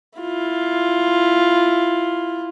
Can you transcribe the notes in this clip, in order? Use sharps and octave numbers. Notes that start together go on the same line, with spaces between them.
E4 F4